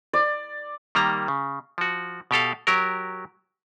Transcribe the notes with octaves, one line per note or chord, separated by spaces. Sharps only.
D5
D#3 G3 A#3 A#5
C#3
F3 F#4
B2 G4 A4 F5
F#3 G4 A#4